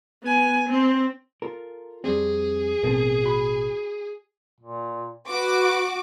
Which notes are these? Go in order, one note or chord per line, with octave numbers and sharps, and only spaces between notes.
B3 G#5
C4
F4 A4 A#4
F2 G3 C4 G#4
A1 B2 C4 A4 A#4
F#4 B5
A#2
F#4 B4 D6